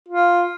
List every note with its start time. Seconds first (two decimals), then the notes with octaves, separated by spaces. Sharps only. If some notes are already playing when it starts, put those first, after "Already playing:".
0.08 F4